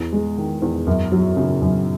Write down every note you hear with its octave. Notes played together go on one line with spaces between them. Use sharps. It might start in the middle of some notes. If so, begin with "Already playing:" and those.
Already playing: E2
G#3
D#3
E2
F#2
F#3
C#3
F#2